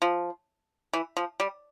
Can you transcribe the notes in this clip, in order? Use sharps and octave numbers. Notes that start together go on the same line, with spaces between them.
F3
E3
F3
G3